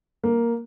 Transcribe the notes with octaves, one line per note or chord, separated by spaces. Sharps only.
A#3